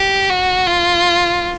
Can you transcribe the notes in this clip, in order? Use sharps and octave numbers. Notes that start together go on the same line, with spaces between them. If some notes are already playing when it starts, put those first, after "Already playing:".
Already playing: G4
F#4
F4